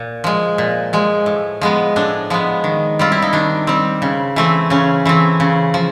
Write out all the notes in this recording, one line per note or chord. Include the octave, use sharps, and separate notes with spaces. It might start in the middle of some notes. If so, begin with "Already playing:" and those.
Already playing: A#2
F3 G#3
A#2
F3 G#3
A2
F3 G#3 B3
A2 D4
F3 G#3 B3
D#3
G3 C4 F4
E4
D#4
D#3 D4
G3 C4
C#3
E3 A3 C4
C#3 C#4
E3 A3 C4
C#3
F3